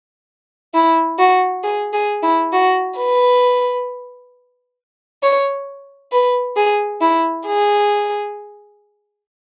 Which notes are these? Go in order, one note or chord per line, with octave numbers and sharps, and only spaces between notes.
E4
F#4
G#4
G#4
E4
F#4
B4
C#5
B4
G#4
E4
G#4